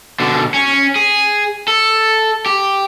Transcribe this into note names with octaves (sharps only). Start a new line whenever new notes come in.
B2 D3
C#4
G#4
A4
G4